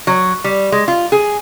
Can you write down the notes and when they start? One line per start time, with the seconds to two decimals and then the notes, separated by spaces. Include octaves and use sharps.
0.07 F#3
0.44 G3
0.72 G#3
0.88 F4
1.12 G#4